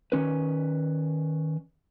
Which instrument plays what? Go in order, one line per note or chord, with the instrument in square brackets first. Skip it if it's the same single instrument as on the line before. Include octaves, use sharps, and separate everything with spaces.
[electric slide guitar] D#3 C#4 B4